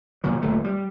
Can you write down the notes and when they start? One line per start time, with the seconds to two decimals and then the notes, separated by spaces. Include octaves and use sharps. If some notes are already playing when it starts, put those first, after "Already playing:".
0.24 A#2 D#3 F3 F#3
0.42 D1 D#2 A#2 A3
0.64 G3